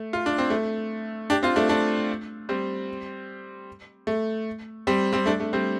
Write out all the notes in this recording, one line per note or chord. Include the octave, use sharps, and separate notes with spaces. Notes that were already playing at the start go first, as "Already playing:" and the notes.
Already playing: A3
F4
D4
C4
A3
D4 G4
C4 F4
A3 D4
A3 D4
G3 C4
A3
G3 C4
G3 C4
A3 D4
A3
G3 C4